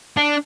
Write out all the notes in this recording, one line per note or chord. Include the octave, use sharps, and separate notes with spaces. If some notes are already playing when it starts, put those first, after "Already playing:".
D4